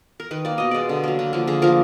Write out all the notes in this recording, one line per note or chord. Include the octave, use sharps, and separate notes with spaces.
A#4
D#3 B4
A#3 D5
B2 D#5
G#3 B3 D5
D3
F#3 A#3
D3
F3 A#3
D3 G#4
F3 A#3 A#4